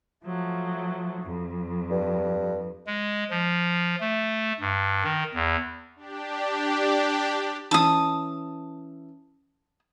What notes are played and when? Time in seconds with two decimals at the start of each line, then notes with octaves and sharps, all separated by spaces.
0.23 F3 F#3 A3
1.20 F2
1.91 G2
2.86 G#3
3.30 F3
4.00 A3
4.60 G2
5.04 D#3
5.34 E2
5.96 D4 G4
7.71 E3 C#4 A5 D#6 E6